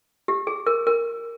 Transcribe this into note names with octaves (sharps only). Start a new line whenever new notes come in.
G4
G#4
A#4
A#4